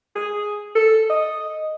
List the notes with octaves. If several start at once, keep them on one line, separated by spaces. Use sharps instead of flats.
G#4
A4
D#5